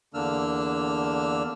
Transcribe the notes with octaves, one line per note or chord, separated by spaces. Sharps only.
E2 D3 A#3 D4 E6 F6